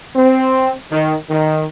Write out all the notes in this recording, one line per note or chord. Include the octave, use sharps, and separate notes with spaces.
C4
D#3
D#3